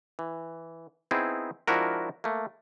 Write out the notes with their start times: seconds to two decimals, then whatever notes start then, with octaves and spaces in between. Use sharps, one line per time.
0.19 E3
1.11 B3 C4 D#4 E4 G#4
1.67 F3 G#3 D4 E4 F#4 A#4
2.24 A3 A#3